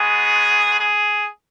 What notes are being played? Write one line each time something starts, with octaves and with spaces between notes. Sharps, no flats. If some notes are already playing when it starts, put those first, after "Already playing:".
Already playing: G#3 B3 F#4 G#4
G#4